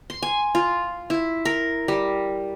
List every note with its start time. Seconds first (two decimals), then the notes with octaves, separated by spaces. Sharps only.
0.10 C6
0.22 G#5
0.55 F4
1.10 E4
1.45 A#4
1.88 G3